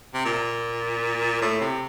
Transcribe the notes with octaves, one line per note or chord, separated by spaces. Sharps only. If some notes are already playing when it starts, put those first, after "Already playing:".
C3
A#2
A2
C3